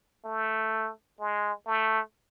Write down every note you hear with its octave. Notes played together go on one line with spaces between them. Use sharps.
A3
G#3
A3